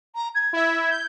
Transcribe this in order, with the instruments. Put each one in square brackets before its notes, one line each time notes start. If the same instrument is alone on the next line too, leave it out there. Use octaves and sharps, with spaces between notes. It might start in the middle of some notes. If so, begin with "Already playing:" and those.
[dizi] A#5
G#6
[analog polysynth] E4 E5
G6